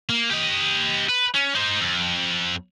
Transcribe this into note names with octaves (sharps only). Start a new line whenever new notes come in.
A#3
G4 D#5
B4
C#4
D#4 C5
F2